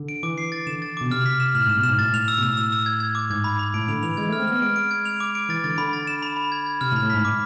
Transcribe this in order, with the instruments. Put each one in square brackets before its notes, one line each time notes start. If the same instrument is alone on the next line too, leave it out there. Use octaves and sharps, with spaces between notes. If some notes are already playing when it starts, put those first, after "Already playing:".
Already playing: [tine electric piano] D3
[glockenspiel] D7
[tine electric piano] E3 [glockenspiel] D6
[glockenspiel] C7
A6
[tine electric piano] D3 [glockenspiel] E7
[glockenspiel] A6
[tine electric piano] B2 [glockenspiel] D6
[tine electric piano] C3 [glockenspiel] F6
[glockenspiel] B6
E7
[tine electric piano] A2 [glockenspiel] F6
[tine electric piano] G#2 [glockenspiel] E7
[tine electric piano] B2
[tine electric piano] G#2 [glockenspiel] E7
[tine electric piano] A2 [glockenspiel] A6
[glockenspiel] F7
E6
[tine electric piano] B2
[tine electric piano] A2 [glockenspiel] E6
[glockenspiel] E6
E6
G#6
G#6
D6
[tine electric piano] G#2 [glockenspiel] G#6
[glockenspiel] B5
B5
[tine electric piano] A2 [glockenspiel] D7
[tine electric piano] D3 [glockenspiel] F7
[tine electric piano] E3 [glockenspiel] F7
[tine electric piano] G#3 [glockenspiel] G#6
[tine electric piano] A3 [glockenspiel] F6
[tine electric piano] C4
[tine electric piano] B3 [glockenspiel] F6
[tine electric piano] G#3 [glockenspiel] D7
[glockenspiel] D7
G#6
F7
D6
D7
[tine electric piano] E3 [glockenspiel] A6
[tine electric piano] D3 [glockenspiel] A6
[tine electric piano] D3 [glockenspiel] B5
[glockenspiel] A6
E7
B5
B5
G#6
G#6
[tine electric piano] C3 [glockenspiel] F6
[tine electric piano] A2
[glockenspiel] B5
[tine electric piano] A2
[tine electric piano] G#2 [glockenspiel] B6
[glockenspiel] D6